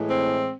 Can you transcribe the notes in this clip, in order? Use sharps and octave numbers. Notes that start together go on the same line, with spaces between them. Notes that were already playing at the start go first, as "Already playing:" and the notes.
Already playing: A2 E3 G#3
C4